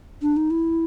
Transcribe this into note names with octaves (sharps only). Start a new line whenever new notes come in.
D4
D#4
E4